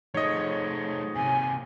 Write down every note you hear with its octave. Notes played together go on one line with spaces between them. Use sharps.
G#2 F3 A3 C#5 D#5
C3 A#3 G#5